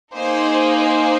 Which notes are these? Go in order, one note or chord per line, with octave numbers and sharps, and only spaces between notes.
A#3 D#4 G#4 C5
C5